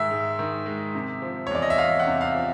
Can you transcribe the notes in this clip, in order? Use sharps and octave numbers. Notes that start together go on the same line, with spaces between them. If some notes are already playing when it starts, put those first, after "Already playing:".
Already playing: G#2 D#3 G#3 E5
G#2
D#3
G#3
C3
F3
C#5
E2 D5
D#5
E5
E2 F5
F#5
C3
F5
F3